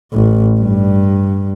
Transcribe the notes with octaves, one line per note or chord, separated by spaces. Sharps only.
A1
G2